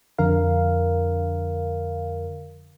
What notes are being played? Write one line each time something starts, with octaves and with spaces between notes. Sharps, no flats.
F2 D3 A#4 F5